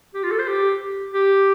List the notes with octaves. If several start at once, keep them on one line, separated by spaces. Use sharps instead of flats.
G4
F4
A4
C5
G4
G4